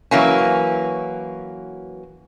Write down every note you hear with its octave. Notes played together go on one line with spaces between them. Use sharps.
E3 F#3 A#3 C#4